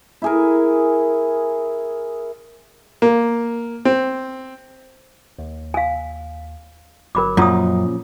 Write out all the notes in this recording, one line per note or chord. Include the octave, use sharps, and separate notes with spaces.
E4 G#4 A#4
A#3
C4
D#2
F5 G#5
G1 F#3 A#4 B5 D6
F#2 A#2 F3 C#4 F4 A#5 D#6